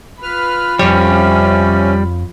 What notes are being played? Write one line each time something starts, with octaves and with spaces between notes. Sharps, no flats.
F4 B4 B5 F6
F2 C3 G3 C#4 C#5